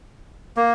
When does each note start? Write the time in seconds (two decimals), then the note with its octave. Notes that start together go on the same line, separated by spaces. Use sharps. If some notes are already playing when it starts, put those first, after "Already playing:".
0.57 A#3